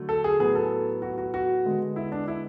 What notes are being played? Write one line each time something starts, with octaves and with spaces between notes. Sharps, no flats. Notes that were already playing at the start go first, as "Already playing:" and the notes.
Already playing: D3 F#3 A3
A4
G#4
A2 F#3 B3 G#4
A4
F#4
F#4
F#4
D3 G#3 B3
E4
D4
E4